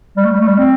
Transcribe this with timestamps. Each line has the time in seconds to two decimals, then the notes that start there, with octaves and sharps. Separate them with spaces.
0.17 G3
0.25 A3
0.32 G3
0.40 A3
0.47 G3
0.58 C4